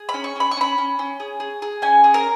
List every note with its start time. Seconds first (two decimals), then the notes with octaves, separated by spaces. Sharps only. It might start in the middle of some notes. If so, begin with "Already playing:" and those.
Already playing: G#4
0.09 B5
0.14 C#4
0.24 C#6
0.36 C#4 B5
0.51 C#6
0.57 C#4 B5
0.78 C#4
0.99 C#4
1.20 G#4
1.40 G#4
1.62 G#4
1.82 C#4 G#5
2.04 G#4
2.14 A#4